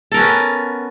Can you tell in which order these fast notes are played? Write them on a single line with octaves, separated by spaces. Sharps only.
A4 A#4 C#4 B3